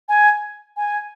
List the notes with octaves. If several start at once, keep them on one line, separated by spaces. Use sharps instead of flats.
G#5
G#5